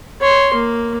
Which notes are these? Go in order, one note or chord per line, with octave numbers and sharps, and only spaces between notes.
C#5 C6
A#3